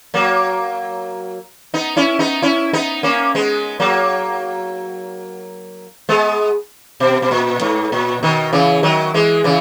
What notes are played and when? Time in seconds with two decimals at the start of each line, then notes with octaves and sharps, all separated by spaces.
0.14 F#3 A#3
1.74 B3 D#4
1.97 C#4 E4
2.19 B3 D#4
2.42 C#4 E4
2.73 B3 D#4
3.03 A#3 C#4
3.35 G#3 B3
3.80 F#3 A#3
6.09 G#3 B3
7.00 B2
7.22 B2
7.31 A#2
7.61 G#2
7.92 A#2
8.23 B2 D#3
8.53 C#3 E3
8.83 D#3 F#3
9.14 E3 G#3
9.44 C#3 E3